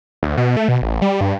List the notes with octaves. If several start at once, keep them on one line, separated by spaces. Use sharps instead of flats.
D2
B2
A3
B2
A1
G3
G2